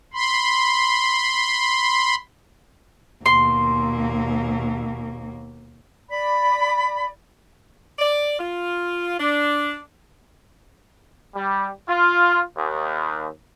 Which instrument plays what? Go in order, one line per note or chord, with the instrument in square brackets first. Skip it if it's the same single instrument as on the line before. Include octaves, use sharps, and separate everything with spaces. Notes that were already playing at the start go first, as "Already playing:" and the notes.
[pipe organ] B5 C6
[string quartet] D#2 B2 A#3 [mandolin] C6
[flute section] D5 B5
[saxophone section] D5
F4
D4
[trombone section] G3
F4
D#2